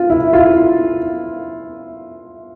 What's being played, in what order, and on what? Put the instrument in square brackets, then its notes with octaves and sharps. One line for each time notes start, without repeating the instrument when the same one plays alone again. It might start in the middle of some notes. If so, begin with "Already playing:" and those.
Already playing: [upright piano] F4
E4
F4